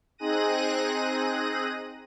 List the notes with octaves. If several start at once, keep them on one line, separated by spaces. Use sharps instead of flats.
C4 D#4 G#4 F#6 A#6 D#7